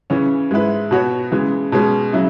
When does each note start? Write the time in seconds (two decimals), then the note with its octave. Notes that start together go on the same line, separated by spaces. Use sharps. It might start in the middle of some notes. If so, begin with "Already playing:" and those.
0.10 C#3 E3 C#4
0.51 G#2 G#3 E4 B4
0.91 B2 B3 F#4 C#5
1.31 C#3 E3 G#3
1.72 B2 G#3 C#4
2.13 C#3 F#3 E4